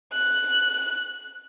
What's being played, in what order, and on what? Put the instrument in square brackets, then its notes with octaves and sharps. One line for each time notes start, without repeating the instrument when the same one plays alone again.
[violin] F#6